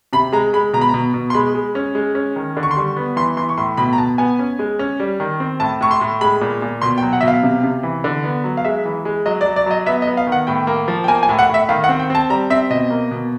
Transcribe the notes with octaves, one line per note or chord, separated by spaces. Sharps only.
C3 B5
G#3 A#5
G#3 B5
B2 A#5
B5
B2 A#5
B2
C6
G#3 B5
G#3
C#4
G#3
C#4
D#3
D3
C#6
C6
G3 C#6
B3
E3 C6
E3 C6
C#6
A2 C6
B2 B5
A#5
B2 A5
B3 G#5
C#4
G#3
C#4
G3
D#3
C4
A2 A5
A2 C#6
C6
A2
G#3 B5
A#2
A#2
B2 C6
G5
F#3
F#5
B2 E5
F5
C3
C3
E3
D3
B3
F#3
F5
G#3 E5
E3
G#3
F#3 D#5
D5
F#3
D5
F#3 D#5
B3 E5
D#5
B3
F5
D#3
F#5
A2 G5
A#3
F3
G5
A#3 G#5
G#5
A2
F#5
A2 E5
D#3 F5
F#5
C4
G5
C4 A5
G3 A#5
C4 E5
B2 D#5
A#3
B2